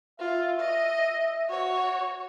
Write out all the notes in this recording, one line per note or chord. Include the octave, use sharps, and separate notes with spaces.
F4 E5
D#5
F#4 C#5